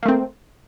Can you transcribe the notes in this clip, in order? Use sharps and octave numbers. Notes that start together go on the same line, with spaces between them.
A3 A#3 C4